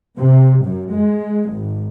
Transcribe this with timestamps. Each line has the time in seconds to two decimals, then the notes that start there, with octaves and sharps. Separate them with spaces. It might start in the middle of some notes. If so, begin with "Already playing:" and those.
0.17 C3
0.64 F#2
0.93 G#3
1.52 G#1